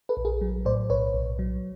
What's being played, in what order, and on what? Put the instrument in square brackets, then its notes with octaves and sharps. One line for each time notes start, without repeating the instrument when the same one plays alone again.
[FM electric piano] A4 B4
A#1
G#4 A#4
F#3
A2 C5 D5
B1 B4 C#5
B1
F#3